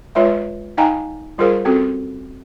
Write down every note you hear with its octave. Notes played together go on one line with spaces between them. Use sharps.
G#3 F4 B4 C#5 E5
D#4 D#5 F5 G5 G#5 A#5
G3 F4 G#4 A#4 C5 F5
C4 C#4 F#4 A4